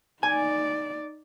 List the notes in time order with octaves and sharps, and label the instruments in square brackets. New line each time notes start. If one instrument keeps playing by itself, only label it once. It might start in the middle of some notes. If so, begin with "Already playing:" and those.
[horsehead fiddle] D#4 D5 [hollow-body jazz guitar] G#5